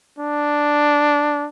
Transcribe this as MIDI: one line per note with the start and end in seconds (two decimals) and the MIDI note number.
0.19 1.47 62